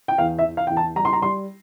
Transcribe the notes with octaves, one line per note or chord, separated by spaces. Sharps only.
G5
E2 F5
E5
E3
F5
E2 G5
A5
G3 A#5
C6
A#5
G3 C6